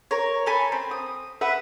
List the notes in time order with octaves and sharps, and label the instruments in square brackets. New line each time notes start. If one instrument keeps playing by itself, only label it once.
[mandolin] A#4 C#5
A4 G#5 B5
C4
D#6
B4 E5 F#5